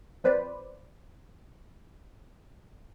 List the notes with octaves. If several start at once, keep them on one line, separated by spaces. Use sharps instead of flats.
F3 C4 B4 C5 D5